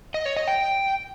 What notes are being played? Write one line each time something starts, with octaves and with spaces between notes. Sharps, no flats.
D#5
C#5
D#5
G5